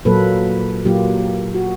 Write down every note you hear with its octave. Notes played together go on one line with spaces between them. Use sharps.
A#2 F#3 A#3 A4 B4
A#2 F#3 A#3 F4 G4
F#4